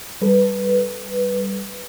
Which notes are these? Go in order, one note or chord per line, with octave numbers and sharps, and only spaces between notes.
G3 A4 B4